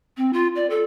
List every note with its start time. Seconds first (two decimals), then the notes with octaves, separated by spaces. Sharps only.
0.17 C4
0.33 F4
0.55 D5
0.70 A4